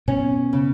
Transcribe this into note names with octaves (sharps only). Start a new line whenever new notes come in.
B2 C#4
C#3